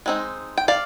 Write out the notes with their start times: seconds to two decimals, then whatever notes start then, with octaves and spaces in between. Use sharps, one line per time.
0.06 G#3 C4 D#4
0.58 G5
0.68 D5 F5